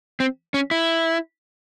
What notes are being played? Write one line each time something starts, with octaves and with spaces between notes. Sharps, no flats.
C4
C#4
E4